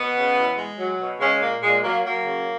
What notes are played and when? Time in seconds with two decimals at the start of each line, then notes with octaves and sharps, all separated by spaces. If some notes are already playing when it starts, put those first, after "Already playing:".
Already playing: B2 B3
0.15 C#3
0.36 E3
0.56 G#3
0.78 F#3
0.99 B2
1.20 C#3 G#3 C#4
1.41 A#2 A#3
1.62 A#2 G#3
1.83 F#3 A#3
2.04 F#3 A#3
2.25 C#3